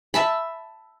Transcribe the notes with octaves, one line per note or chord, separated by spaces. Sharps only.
E5 A5 B5